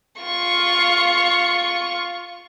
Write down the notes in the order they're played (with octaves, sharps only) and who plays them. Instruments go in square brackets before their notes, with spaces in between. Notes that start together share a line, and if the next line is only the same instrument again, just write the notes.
[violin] F4 C#6